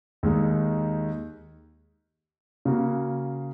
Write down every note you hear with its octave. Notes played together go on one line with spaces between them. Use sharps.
D#2 D#3 G#3 D#4
C#3 A#3 F#4